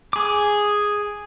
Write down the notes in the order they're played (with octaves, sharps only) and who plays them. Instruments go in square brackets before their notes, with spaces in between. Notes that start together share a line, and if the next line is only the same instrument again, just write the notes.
[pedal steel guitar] G#4 D6